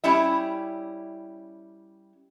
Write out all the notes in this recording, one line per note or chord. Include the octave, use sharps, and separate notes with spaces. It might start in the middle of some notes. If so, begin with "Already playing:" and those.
G3 C#4 E4 E5